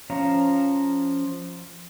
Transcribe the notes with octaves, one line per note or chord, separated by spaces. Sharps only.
F3 C#4 F5 A#5